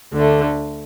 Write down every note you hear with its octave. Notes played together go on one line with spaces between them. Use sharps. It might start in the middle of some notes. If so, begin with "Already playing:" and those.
D2 D3 A3